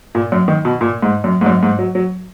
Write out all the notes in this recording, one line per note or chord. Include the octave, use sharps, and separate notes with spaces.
A#2
F#2
D#3
B2
A#2
G#2
F#2
G#2
F#2
G#2
F#3
F#3